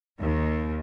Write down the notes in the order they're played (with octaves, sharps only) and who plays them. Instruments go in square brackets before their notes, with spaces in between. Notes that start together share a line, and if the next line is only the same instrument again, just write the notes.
[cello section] D#2